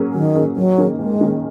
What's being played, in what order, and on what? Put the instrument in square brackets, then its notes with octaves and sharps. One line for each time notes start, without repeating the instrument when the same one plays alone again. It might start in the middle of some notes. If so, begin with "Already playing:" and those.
Already playing: [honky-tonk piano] F#3 A#3 C#4 G#4
[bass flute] D#3 [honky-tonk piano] F#3
[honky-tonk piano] A#3 C#4 G#4
[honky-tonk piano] D#2 [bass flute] F#3
[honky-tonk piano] D#3 A#3 C#4 G#4
[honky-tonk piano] D#2 [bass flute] G#3
[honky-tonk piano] D#3 A#3 C#4 G#4